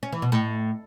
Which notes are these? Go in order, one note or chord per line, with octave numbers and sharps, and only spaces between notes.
C#4
E3
B2
A2